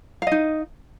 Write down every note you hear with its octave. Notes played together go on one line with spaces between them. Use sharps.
D#4 D#5 F5